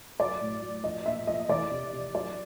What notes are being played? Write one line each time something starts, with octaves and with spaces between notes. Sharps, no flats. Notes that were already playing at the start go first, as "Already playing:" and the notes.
F#3 D5
A2
F#3
F3 D#5
A#2 E5
F3 D#5
E3 D5
C3
C3
F#3 D5